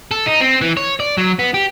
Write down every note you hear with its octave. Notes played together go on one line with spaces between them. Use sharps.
A4
D#4
C4
E3
C#5
D5
F#3
B3
G4